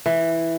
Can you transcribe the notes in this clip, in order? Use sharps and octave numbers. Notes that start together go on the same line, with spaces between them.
E3